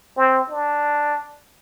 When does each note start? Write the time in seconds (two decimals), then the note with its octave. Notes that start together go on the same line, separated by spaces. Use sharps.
0.17 C4
0.50 D4